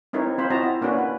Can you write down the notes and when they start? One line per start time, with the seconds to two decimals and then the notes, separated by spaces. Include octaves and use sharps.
0.13 C4 D#4 E4 A#4 B4 C#5
0.38 C4 F4 C5 B5
0.50 C4 E4 F#4 D#5 A5 A#5
0.63 E4
0.81 A#3 C#4 D4 F#4 B4
0.99 B4